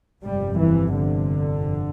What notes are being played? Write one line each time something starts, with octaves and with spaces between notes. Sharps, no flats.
G1 F2 C3 G3
E3
D3